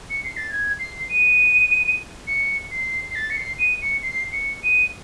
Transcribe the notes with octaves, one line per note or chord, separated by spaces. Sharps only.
C#7
C7
A6
G#6
C7
D#7
C#7
C7
C7
A6
C#7
C7
D#7
C#7
C7
C#7
D#7